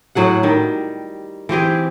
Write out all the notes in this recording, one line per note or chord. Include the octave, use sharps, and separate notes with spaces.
A2 F#3 G#4 F#5
D#3 G3
E3 C4 G4 G#4